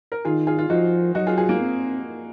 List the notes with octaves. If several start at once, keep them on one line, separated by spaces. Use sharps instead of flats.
A#4
D#3 F4 G#4
F4 G#4
F4
F3 D#4 F#4
F#3 D#4 F#4
F4 G#4
F4 G#4
A#3
C4